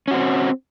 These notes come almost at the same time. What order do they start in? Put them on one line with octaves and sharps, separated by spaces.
C#4 F#4 C4